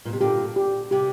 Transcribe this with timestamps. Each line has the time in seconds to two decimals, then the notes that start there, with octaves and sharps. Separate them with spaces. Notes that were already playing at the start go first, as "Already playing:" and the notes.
0.05 A#2
0.13 C3
0.21 A#2 D3 G4
0.56 G4
0.91 C3 G4